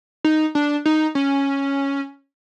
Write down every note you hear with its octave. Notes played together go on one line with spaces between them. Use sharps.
D#4
D4
D#4
C#4